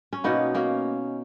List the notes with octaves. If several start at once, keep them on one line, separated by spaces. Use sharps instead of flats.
C#4
B2 A#3 B3 D#4
A#3 C#4